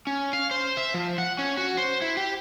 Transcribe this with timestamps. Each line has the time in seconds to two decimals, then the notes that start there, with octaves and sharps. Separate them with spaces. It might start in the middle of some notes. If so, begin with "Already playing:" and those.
0.07 C#4
0.33 F5
0.51 C5
0.77 E5
0.94 F3
1.18 F#5
1.39 C#4
1.58 F#4
1.77 C5
2.02 E4
2.17 G4